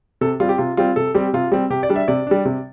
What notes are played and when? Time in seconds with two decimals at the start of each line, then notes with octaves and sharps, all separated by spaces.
0.21 C3 A4
0.40 G3 F4
0.43 C4
0.49 G4
0.58 C3 F4
0.77 G3 C4 F4
0.96 C3 A4
1.15 G3 C4 G4
1.33 C3 F4
1.52 G3 C4
1.70 C3 G4
1.83 D5
1.89 G3 D4
1.96 E5
2.08 C3 D5
2.27 G3 D4
2.45 C3